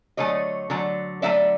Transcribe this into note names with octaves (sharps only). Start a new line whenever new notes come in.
D3 F#3 A3 C#5 D#5
D3 F#3 A3
D3 F#3 A3 D5 E5